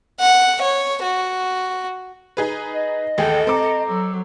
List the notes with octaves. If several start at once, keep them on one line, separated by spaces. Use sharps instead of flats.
F#5
C#5
F#4
D#4 G#4 B4
D#5
A1 D#2 G#4 A4 G5
C4 A#5 D6
F#3 A4